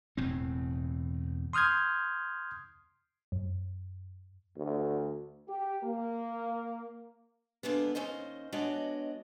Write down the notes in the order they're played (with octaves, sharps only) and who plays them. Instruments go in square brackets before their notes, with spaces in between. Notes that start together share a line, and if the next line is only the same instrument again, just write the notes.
[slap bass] E1 E2 A2 C4
[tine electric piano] C6 D#6 F6 G6 G#6
[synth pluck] F#2
[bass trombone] D2
[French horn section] G4
A#3
[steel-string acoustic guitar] D3 G#3 A#3 B3
D#2 C#4 C5 D#5
G#3 B3 D4 F#4 C#5 D#5